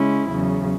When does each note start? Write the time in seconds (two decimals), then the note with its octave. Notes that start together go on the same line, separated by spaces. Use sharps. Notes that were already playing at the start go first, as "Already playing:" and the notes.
Already playing: C#3 G#3 C#4 E4
0.29 E2 C#3 F#3